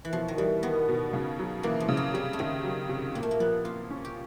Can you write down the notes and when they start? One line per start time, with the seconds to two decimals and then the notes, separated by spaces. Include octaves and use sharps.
0.05 E3
0.12 B2 F3
0.28 D#3
0.38 E3 G3
0.63 D#3 B3
0.89 B2
1.13 C#3
1.39 F#3
1.63 E3 A#3
1.80 F3
1.89 C#3
1.97 F#3
2.14 C3 G3
2.33 A3
2.39 D#3 G#3
2.64 F#3
2.89 C3
3.15 A#2 A#3
3.23 A3
3.31 A#3
3.40 F3 B3
3.65 A#3 F4
3.91 C#4
4.05 G4